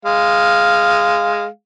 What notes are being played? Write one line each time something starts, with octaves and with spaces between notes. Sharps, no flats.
G#3 F5